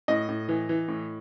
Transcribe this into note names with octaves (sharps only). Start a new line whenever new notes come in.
A2 D#5
A2
E3
E3
A2